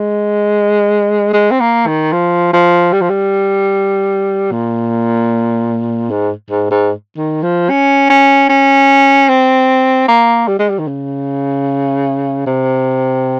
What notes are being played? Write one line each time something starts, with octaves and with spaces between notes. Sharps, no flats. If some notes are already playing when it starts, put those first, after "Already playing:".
Already playing: G#3
G#3
C4
A#3
D#3
F3
F3
G3
F3
G3
A#2
G#2
G#2
G#2
D#3
F3
C#4
C#4
C#4
C4
A#3
G3
G#3
G3
D#3
C#3
C3